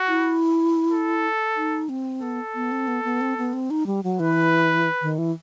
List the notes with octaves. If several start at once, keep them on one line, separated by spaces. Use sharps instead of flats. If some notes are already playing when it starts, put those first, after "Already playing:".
Already playing: F#4
E4
A4
D#4
C4
B3 A4
B3
C4
B3
B3
C4
B3
C4
D#4
G3
F#3
E3 B4
D#3
E3